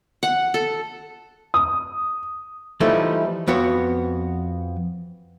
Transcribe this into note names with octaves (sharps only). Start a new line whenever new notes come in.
F#5
A4
D#6
E3 F3 G3 A3 D#4 A4
F2 B3 F#4 C#5